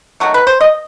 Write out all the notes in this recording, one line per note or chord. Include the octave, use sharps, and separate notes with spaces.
D#3 F#3 A3 F#4
B4
C5
D#5